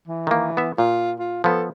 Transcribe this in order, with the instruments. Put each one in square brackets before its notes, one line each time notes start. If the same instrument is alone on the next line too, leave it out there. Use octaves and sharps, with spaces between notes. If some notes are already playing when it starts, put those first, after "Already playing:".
[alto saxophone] E3
[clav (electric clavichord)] D#3 A#3
B3 E5
[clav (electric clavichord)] A#2 [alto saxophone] F4
[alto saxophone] F4
[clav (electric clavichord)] F3 B3 [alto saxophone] A4